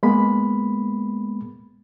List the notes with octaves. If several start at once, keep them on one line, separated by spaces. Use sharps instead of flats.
G#3 A#3 B3 B5